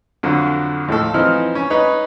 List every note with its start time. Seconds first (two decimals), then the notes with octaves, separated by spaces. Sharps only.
0.23 F2 D3 F3 F#3
0.88 D#2 A2 F3 A4
1.14 E3 F3 C4 D#4 F6
1.55 C#4
1.70 D#4 B4 C#5